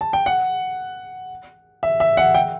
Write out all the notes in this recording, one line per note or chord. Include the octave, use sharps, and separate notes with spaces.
A5
G5
F#5
E5
E5
F#5
G5